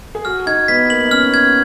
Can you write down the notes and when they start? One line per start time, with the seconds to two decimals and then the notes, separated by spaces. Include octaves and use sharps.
0.15 G#4
0.25 F#4 F6
0.46 D#4 G#6
0.68 B3 B6
0.90 A#3 F#7
1.05 D#4
1.11 C#4 F6
1.34 G#6